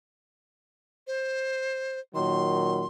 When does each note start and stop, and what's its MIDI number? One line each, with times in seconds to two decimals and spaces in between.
1.07 2.00 72
2.15 2.87 46
2.15 2.87 51
2.15 2.87 54
2.15 2.87 84